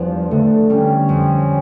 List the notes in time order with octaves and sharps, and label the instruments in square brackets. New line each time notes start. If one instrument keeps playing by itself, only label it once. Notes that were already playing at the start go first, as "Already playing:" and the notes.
Already playing: [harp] E2 G3 D4 [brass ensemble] F3
[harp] D3 [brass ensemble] A3
[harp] G3 [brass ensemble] C#4
[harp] F2